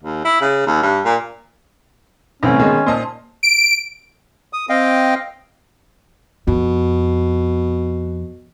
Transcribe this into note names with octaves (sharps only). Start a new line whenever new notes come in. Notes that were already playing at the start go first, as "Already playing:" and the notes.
D#2
E4
C#3
D#2
G2
A#2
C2 D3 E3 A3 C4 C#4
B2 D#3 G#3
A#2 C5 D#5 A5
D7
D#6
C4 D#5 F5 G5
F2 B2